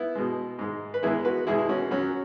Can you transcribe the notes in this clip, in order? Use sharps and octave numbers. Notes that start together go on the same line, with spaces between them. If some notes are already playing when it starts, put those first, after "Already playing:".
Already playing: B3 E4
B2 G#3
G#2 G#3
B4
E2 E3 G#3 E4 G#4
F#4 B4
E2 B2 G#3 E4 G#4
E4
C#4 F#4
F#2 F#3 C#4 F#4